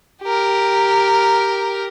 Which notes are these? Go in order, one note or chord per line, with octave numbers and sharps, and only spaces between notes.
G4 A#4